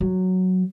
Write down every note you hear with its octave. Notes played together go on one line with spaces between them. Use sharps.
F#3